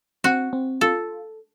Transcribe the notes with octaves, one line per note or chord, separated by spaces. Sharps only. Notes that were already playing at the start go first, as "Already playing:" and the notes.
C4 F#4
C4
F4 A4